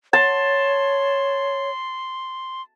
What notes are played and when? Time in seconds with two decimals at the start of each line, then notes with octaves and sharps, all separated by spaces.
0.13 C#5 A5 C6